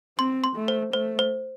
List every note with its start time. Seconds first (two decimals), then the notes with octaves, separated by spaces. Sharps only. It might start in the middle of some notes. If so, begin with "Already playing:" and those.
0.19 C4 C6
0.44 C6
0.56 A3
0.68 C5
0.93 A3 C5
1.19 C5